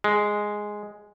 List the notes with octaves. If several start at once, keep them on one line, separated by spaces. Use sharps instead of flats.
G#3